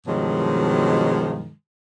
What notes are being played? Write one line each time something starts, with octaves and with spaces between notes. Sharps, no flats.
G2 B2 D#3 F3 F#3 G#3